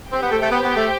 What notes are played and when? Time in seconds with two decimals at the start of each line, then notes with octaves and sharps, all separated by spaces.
0.11 C4 G4 C5 G5
0.21 B3
0.31 A3
0.41 A3
0.50 B3
0.63 B3
0.76 A3